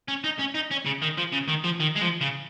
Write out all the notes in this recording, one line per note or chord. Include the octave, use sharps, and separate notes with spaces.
C#4
D#4
C#4
D#4
C#4
C#3
D#3
F3
C#3
D#3
F3
D#3
G#3
F3
C#3